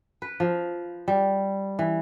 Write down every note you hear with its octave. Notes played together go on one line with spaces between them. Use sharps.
B4
F3
G3
E3